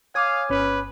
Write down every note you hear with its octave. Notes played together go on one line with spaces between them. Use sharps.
C#5 F5 G#5 D6 D#6 G#6
G1 C#4 B4